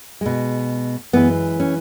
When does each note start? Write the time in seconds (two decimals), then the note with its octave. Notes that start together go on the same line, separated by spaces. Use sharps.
0.21 B2 G#3
1.13 F#2 E3 G#3 B3
1.60 C#4